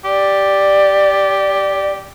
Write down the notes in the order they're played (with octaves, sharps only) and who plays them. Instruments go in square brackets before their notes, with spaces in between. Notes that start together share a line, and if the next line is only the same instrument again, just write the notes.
[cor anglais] G4 [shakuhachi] D5